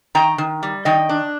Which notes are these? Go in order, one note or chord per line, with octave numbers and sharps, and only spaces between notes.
D#3 G5 A#5
D#3
G3
D#3 D#5 G5
D4